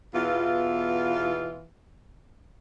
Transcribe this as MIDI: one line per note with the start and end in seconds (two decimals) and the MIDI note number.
0.14 1.64 40
0.14 1.64 47
0.14 1.64 52
0.14 1.64 65